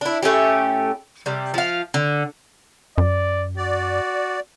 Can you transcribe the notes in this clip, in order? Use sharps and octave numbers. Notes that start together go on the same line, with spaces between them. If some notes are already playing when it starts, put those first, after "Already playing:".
D4 E4
A2 A3 C#4 G4
C3 G3
F3 F5
D3
F#2 D5
F#4 D5